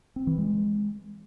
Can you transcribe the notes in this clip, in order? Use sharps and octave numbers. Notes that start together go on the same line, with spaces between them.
C4
E3
G#3